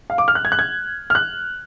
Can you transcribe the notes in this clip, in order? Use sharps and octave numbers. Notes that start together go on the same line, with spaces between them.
F5
D6
F6
F#6
G#6
F#6
G#6
F6
F#6